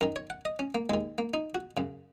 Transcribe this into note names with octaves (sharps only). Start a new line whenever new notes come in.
F#2 D#3 A#4
C#5
F#5
D#5
C#4
A#3
D#2 D#3 G#3
A#3
D#4
F#4
F#2 C#3